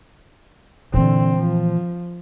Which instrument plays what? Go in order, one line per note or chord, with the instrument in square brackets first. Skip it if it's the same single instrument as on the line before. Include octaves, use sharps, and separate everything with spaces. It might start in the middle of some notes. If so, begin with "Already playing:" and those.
[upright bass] A#2 E3 [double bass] D3 C4
[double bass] F3